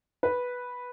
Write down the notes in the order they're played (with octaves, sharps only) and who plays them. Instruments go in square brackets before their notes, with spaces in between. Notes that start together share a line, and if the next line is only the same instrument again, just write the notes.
[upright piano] B4